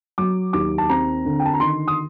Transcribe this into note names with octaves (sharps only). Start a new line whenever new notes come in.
F#3 D6
D#2 D6
A5
C4 A#5
D3
G5
A5
A#5
D#3 C6
D#6